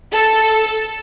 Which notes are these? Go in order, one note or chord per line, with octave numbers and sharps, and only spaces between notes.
A4